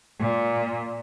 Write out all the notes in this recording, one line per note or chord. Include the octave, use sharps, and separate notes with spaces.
A#2